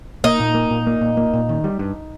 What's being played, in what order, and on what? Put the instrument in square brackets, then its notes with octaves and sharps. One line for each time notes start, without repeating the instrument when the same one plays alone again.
[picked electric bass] A#3 [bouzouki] D#4
[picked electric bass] A#2
A#3
A#2
A#3
A#2
A#3
A#2
D#3
G3
G2